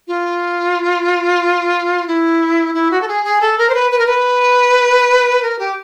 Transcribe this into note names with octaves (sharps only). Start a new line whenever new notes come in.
F4
E4
E4
F#4
A4
G#4
G#4
A4
A#4
C5
B4
B4
A#4
B4
A#4
G4